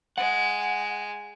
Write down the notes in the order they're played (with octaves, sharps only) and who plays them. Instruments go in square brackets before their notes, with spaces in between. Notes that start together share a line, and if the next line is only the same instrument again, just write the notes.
[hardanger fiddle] G#3 [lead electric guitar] F#5